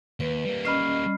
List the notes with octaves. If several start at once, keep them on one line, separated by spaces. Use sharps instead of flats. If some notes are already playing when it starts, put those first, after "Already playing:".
D#2 B4
G3 A#3
C#4 D#5 B5 F6 C7